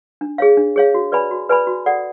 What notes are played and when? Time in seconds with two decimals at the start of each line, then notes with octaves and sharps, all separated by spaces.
0.21 D4
0.38 G#4 C#5 F5
0.57 D4
0.76 G#4 C#5 F5
0.94 F#4
1.12 B4 D5 G#5 B5
1.31 F#4
1.49 B4 D5 G#5 B5
1.67 F#4
1.86 A4 D5 F#5